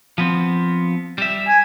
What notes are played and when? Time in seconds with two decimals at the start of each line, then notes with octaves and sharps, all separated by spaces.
0.18 F3 B3 C4
1.18 G3 E5
1.48 G#5